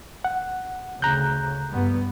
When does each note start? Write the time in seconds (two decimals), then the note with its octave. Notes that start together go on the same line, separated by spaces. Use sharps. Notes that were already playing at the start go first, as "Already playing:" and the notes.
0.25 F#5
1.02 D2 C#3 A#5 F#6 G6
1.70 G2 B3